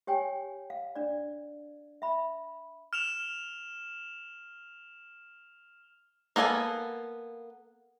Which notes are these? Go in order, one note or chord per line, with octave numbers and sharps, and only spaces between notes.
G4 C#5 G5 G#5
F5
D4 D5
E5 B5
F6 E7 F7
A#3 B3 A4 D#5 G#5